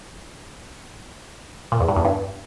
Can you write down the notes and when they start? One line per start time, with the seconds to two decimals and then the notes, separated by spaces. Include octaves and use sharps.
1.72 A#2
1.80 E2
1.88 G2
1.96 E2
2.05 G2